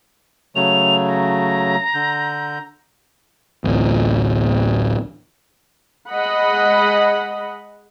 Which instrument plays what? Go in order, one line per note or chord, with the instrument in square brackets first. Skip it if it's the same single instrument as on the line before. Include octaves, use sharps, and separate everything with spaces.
[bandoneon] C#3 F#3 A3 [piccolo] F7
[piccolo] A#5
[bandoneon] D3 G6
[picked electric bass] D1 A1
[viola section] G#3 D#5 F#5 B5